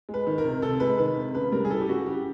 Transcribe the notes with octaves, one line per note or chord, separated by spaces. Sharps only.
G#3
B4
D#3
A#4
C3
C3 A4
G#3 B4
D#3 B4
C3
C#3 B4
G3 A#4
G#4
E3 A4
G4
C#3 F#4
C#3 G4